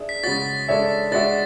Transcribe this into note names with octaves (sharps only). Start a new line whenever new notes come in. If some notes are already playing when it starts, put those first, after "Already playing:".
Already playing: D4 G#4 E5
B6
C#3 G#3 C#4 F#4 A6
G#3 D4 A4 C#5 E5
G#3 D4 F#4 C#5 E5 A6